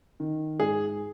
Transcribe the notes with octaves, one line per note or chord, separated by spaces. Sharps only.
D#3
G#2 G#4